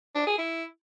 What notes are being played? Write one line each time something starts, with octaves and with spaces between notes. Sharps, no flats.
D4
G#4
E4